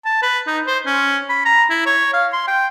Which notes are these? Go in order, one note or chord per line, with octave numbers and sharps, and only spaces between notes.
A5
B4
D#4
C5
C#4
B5
A#5
E4
C#5
F5
C6
G5